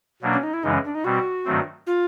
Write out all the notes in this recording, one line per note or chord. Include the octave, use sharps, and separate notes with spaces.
B2 F#3 A#3 D4
C#4
D#4
E4
F#2 C#3 E3 G#3 D#4
C#4
D4
D#4
B2 G3 C4 F#4
G2 D#3 F#3 A3 C4
F4